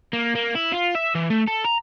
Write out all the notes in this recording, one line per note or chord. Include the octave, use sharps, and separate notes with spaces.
A#3
A#3
E4
F4
E5
E3
A3
A4
A#5